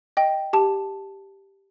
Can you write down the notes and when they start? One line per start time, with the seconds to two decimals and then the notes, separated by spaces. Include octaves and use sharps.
0.17 D#5 G5
0.53 G4 A5